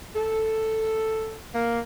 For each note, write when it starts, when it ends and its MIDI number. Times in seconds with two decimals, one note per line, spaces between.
0.16 1.36 69
1.55 1.79 58